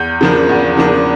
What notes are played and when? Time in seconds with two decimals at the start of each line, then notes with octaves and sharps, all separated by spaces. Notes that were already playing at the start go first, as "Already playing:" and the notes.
Already playing: E2 G6
0.21 C#3 F3 A#3 D4
0.49 E2
0.77 C#3 F3 A#3 D4